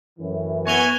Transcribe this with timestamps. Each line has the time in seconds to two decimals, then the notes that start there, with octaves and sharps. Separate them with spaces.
0.19 F#2 A2 E3
0.67 B3 E4 F#4 G#5 C#6 F7 G7